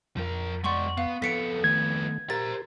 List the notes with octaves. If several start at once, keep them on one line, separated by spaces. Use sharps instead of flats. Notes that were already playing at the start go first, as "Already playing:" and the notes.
F2 F3 A#4
G#3 D5 F#5 C6 C#6
B3 F5
F2 B3 A4 B6 C#7 D7
D#3 A3 G#6
G4 A#4 C5 A#5 A6